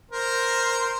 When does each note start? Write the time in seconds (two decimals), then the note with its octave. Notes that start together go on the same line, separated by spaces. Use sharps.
0.12 A#4 C5